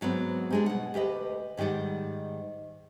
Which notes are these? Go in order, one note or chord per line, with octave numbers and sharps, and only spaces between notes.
G#2 F#3 B3 C4
G3 G#3 D4
B2 F#5
D2 G4 B4 D#5
G#2 D#3 G3 D5 F#5